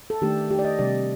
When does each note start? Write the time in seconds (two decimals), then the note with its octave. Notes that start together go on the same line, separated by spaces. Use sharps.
0.10 A4
0.22 D#3 A3 D4 G4
0.50 G4
0.59 D5
0.65 D#5
0.79 C3 G3 D4 D5